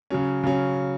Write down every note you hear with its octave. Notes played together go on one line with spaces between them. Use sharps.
C#3 F#3 C#4
C#3 F#3 C#4